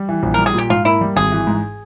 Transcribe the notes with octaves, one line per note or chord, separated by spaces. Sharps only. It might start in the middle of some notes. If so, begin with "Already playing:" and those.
Already playing: G3
E3
A#1
G3 A#4
G#4
A#2 G4
G#2 F4
A#3 E4
G3
G#1 G#4
E3
G#2